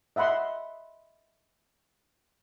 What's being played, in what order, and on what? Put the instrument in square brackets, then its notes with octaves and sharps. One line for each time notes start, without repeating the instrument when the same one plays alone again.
[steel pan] D#5 E5 F#5 B5 C6